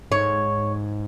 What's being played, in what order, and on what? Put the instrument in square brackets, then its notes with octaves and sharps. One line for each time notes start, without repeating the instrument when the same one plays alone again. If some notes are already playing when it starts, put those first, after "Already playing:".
[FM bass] G#2 [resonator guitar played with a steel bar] C#5